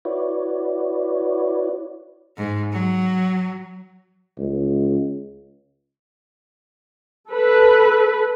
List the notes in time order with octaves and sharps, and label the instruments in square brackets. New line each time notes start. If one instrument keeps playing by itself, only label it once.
[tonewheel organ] E4 F#4 B4 C#5 D5
[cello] G#2
F#3
[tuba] C#2
[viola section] A4 B4